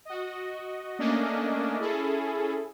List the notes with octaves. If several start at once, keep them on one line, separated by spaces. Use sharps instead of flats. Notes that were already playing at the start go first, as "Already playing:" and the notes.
F#4 D#5
A3 A#3 C#4 D4 D#5
C#4 E4 G#4 A4